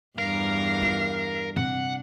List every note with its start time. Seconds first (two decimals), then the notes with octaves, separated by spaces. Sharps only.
0.18 E2 G2 A#4 F5
0.82 F4
1.57 C3 D4 F#5